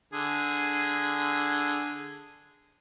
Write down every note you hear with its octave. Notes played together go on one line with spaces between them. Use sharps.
D3 G#4